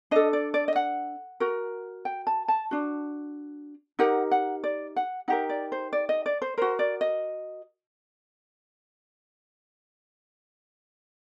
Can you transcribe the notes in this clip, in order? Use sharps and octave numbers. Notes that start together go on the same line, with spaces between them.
D4 A4 D#5
D5
D5
D#5
F#5
F#4 A#4
G5
A5
A5
D4 F#4
D#4 G4 A#4 F#5
F#5
D5
F#5
D#4 G4 A#4 F#5
D5
C5
D5
D#5
D5
C5
F#4 A#4 C5
D5
D#5